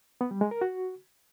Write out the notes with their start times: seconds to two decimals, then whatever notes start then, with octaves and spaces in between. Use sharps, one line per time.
0.21 B3
0.31 G3
0.41 G#3
0.51 A#4
0.61 F#4